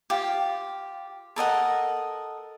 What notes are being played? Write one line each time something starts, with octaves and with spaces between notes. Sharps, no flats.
F4 G4
A4 A#4 D#5 F#5